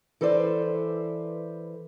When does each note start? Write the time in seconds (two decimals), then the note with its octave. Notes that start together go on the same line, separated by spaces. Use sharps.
0.21 E3 A4 B4 C5 D5